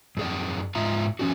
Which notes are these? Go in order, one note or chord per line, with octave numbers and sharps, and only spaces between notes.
F#2 G#4 D5
G#2 F4 E5 A#5
F3 C#4 D4 F#4